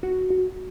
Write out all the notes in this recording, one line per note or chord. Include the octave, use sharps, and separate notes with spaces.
F#4
F#4